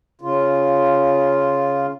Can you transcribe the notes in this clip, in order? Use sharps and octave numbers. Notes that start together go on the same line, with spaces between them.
C#3 F4